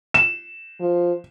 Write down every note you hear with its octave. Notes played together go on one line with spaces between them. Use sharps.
E7
F3